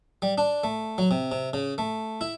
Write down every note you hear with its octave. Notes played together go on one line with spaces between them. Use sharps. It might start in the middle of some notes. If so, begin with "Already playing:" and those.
G3
D4
A3
F#3
C3
C3
C#3
A3
E4